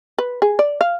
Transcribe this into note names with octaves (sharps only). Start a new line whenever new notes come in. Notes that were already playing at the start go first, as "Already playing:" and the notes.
B4
G#4
D5
F5